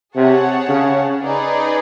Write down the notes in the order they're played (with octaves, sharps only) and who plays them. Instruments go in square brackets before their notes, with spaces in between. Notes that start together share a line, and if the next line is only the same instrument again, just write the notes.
[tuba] C3 [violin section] G#4 C#5 F#5 A5
[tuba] C#3
[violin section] D#4 G#4 B4 D5